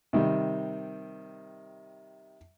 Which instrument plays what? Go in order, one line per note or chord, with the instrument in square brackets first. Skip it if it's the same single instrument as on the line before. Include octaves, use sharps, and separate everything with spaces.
[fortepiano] C3 D#3 G3